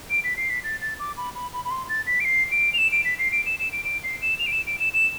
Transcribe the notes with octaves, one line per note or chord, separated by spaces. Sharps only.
D7
B6
C7
B6
A6
A6
D6
B5
B5
B5
B5
C6
A6
B6
D7
C7
D7
F7
E7
D7
B6
C7
D7
E7
E7
D7
D7
C7
E7
F7
D7
E7
D7
E7
E7